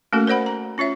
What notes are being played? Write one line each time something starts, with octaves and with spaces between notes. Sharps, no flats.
A3 A#3 C#4 F#4 A4 A#4
A#4 C5 D5 F#5 B5
A#5
C#4 F4 C#5 E5